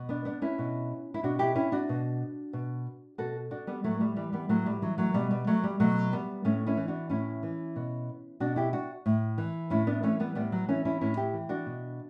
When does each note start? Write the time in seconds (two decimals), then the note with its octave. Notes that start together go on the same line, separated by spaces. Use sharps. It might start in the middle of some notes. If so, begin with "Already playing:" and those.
Already playing: B2
0.09 B3 D4
0.25 B3 D4
0.42 C#4 E4
0.59 B2
1.14 E4
1.23 B2 D4 F#4
1.39 E4 G4
1.55 C#4 E4
1.72 D4 F#4
1.89 B2
2.53 B2
3.18 B2 F#4 A4
3.51 D4 F#4
3.67 G3 B3
3.84 A2 F#3 A3
4.01 G3
4.16 E3 G3
4.32 G3 B3
4.49 A2 F#3 A3
4.66 G3
4.82 E3 F#3
4.98 F#3 A3
5.14 B2 G3 B3
5.31 G3
5.47 F#3 A3
5.64 G3
5.80 B2 F#3 A3
6.12 G3 B3
6.44 A2 A3 C#4
6.67 C#4 E4
6.77 E3
6.88 D4 F#4
7.10 A2 C#4 E4
7.43 E3
7.76 B2
8.40 B2 D4 F#4
8.56 E4 G4
8.73 D4 F#4
9.06 A2
9.38 E3
9.70 A2 C#4 E4
9.87 B3 D4
10.03 E3 A3 C#4
10.20 G3 B3
10.35 A2 G3 B3
10.52 F#3
10.69 E3 C#4 E4
10.85 C#4 E4
11.01 A2 C#4 E4
11.17 E4 G4
11.33 E3
11.49 D4 F#4
11.66 B2